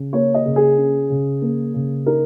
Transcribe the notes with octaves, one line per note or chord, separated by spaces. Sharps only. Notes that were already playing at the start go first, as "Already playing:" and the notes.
Already playing: C#3 C#4
A#3 C#5
D#5
C#3
G#4
C#4
C#3
A#3
C#3
D#4 A#4